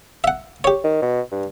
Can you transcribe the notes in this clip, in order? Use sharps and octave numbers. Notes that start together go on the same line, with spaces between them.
E5 F#5
G4 C#5
D#3
B2
G2